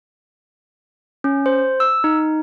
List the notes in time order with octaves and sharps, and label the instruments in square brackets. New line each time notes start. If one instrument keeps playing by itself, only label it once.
[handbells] C#4
C5
E6
D#4